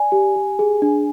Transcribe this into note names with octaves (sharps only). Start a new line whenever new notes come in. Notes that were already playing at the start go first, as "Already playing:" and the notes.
Already playing: D5 G#5
G4
G4
G#4
D4